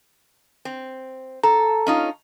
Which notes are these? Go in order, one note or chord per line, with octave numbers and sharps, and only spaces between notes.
C4
A4 A#5
C#4 D#4 F4